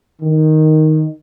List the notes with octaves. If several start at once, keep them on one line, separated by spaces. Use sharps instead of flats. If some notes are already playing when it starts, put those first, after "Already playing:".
D#3